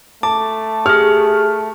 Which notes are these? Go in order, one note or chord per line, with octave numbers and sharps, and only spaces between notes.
A3 A5 D6
G4 G#4 F6